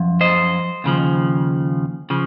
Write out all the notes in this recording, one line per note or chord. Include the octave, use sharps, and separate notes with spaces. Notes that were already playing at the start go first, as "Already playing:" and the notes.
Already playing: F#2 F3
C5 D#5
D#2 C#3 F3
C#3 F3